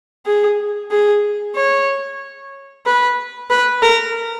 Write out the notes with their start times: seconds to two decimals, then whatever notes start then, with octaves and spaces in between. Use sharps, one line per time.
0.26 G#4
0.91 G#4
1.56 C#5
2.85 B4
3.50 B4
3.82 A#4